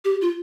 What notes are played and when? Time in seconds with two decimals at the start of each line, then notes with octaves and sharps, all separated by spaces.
0.05 G4
0.22 F4